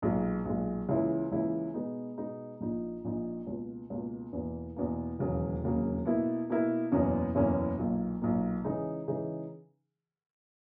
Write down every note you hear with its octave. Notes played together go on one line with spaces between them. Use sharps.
B1 A#2 G#3
B1 A#2 G#3
C#2 C#3 E3 A#3 E4
C#2 C#3 E3 A#3 E4
B2 G#3 B3 D#4
B2 G#3 B3 D#4
A#1 A#2 A#3 D#4
A#1 A#2 A#3 D#4
C#2 B2 A#3
C#2 B2 A#3
E2 B2 A#3
E2 B2 A#3
E1 D#2 C#3 F#3 A#3
E1 D#2 C#3 F#3 A#3
B2 A#3 E4 A#4
B2 A#3 E4 A#4
F#1 E2 B2 A#3 C#4
F#1 E2 B2 A#3 C#4
B1 A#2 A#3
B1 A#2 A#3
C#3 E3 G#3 D#4 G#4
C#3 E3 G#3 D#4 G#4